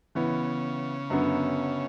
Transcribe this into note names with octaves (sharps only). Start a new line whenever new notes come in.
C#3 E3 B3 E4
F#2 D3 F#3 B3